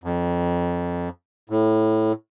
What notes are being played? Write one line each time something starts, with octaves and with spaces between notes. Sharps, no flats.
F2
A2